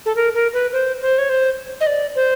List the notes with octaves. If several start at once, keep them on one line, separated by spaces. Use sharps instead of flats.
A4
A#4
A#4
B4
C5
C5
C#5
C5
D#5
D5
C5